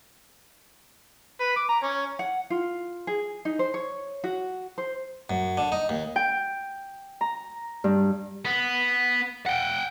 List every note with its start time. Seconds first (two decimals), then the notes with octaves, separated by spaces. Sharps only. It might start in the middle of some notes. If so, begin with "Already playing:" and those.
1.41 B4
1.57 D6
1.69 A#5
1.83 C#4
2.19 F#5
2.50 F4
3.07 G#4
3.45 D#4
3.59 C5
3.74 C#5
4.24 F#4
4.78 C5
5.30 F#2
5.57 D3
5.72 D#4
5.89 D#2
6.16 G5
7.21 A#5
7.84 G2
8.45 B3
9.46 F#5 G5